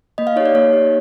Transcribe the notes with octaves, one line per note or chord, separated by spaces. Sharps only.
A#3 D#5
F5
D#4 G4 C#5
D5
A#3 C#5
D#4 G4